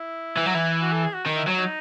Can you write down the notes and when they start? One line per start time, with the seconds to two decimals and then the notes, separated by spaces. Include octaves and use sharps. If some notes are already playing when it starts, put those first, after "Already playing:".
Already playing: E4
0.37 E3
0.46 F#3
0.55 E3
0.81 F#4
0.92 A4
1.03 G#4
1.14 F#4
1.26 D#3
1.36 E4
1.47 F#3
1.58 D#4